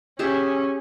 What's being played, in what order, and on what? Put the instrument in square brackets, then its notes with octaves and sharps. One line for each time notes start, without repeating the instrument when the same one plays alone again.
[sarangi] C#4 [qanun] G4 G#4 E5